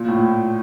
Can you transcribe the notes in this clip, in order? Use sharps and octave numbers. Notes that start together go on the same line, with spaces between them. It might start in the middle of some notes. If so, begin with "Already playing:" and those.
Already playing: A#2
A2